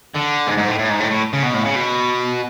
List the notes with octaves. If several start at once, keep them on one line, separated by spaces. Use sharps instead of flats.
D3
G#2
G#2
A2
A2
G#2
A2
A2
C#3
B2
A2
C#3
B2